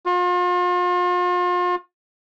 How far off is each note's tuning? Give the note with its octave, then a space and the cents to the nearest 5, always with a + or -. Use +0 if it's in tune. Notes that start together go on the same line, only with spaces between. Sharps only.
F4 +40